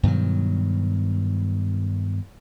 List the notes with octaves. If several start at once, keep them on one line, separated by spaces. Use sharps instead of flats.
G2 B2 D#3 F#3